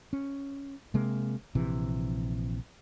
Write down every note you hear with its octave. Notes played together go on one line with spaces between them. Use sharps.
C#4
C3 G#3 A#3
A#1 C3 E3